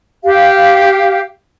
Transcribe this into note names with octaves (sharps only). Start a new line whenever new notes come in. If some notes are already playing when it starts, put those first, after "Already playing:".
G4 F5